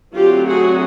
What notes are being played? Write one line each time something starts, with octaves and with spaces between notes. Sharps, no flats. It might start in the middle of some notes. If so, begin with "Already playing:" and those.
D3 F#3 A3 C4 F4 G4
F#4 G#4